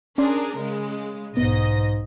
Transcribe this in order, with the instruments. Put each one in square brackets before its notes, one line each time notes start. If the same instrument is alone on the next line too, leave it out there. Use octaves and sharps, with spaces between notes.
[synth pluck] C#4 D5 C6 [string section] D4 G#4 A#4
[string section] C#3 G#3
[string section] B1 D#5 A#6 [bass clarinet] G#2 [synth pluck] B3